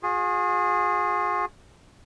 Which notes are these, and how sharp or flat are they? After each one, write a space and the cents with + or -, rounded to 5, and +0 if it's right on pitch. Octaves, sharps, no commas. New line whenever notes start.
F4 +45 G#4 -10